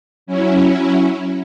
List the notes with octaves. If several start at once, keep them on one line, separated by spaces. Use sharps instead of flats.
F#3 C#4 E4